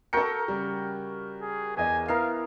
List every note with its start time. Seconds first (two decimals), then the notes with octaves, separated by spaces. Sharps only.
0.13 F#4 A4 A#4 G5 C#7
0.48 C#3 G3
1.42 G#4
1.77 E2 G#4 D#5 G#5
2.08 B3 E4 A#4 F5 C7